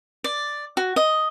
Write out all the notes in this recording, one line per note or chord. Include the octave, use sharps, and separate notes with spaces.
D5
F#4
D#5